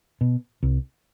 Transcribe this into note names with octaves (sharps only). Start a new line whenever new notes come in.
B2
C2